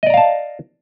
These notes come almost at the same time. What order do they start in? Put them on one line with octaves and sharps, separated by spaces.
D#5 D5 A#5 F5 A5